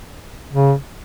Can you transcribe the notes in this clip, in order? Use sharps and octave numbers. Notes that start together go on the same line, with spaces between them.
C#3